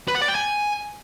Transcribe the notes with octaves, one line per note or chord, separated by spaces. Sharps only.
B4
F#5
D5
G5
G#5